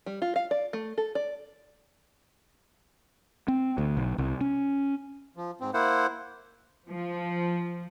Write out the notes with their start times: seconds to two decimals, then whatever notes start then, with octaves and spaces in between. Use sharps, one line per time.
0.06 G3
0.22 F4
0.36 F5
0.51 D5
0.73 A3
0.98 A4
1.15 D5
3.48 C4
3.78 D2
3.97 B1
4.18 C2
4.41 C#4
5.37 F3
5.61 G#2 C4
5.74 A#3 E4 C5 F#5
6.89 F3